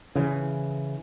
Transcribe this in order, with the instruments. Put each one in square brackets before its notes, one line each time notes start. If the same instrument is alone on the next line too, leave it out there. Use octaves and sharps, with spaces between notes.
[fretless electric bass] C#3 E3